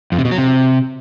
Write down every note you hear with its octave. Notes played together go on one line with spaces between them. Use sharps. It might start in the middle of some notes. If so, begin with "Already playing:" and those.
F2
C3
B2
F#3
C3